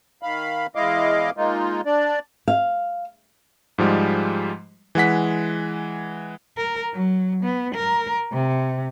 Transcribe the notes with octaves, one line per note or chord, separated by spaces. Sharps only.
D#3 F5 B5
E2 G#3 E4 D#5 F5 D6
G#3 A#3 D#4 F4
D4 D5
F5
G#2 F3 G3 G#3
E3 G#3 F#5 B6
A#4
F#3
B3
A#4
C3